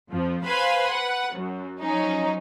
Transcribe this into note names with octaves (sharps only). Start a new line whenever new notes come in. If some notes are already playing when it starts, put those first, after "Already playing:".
F2 F3
B4 C5 F5 G#5 B5 C6
B4 F#5
F#2
F3 F#3 C#4 D#4